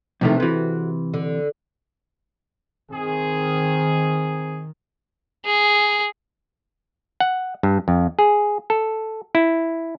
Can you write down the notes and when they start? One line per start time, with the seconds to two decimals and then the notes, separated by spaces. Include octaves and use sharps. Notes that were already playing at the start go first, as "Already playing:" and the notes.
0.21 F2 A2 C3 D#3 E3 A3
0.40 C3 E3 F#4 B4
1.14 D3
2.91 D#3 C4 G#4
5.46 G#4
7.20 F#5
7.63 G2
7.88 F2
8.19 G#4
8.70 A4
9.35 E4